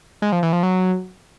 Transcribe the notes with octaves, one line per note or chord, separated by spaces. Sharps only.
G#3
F3
E3
F3
F#3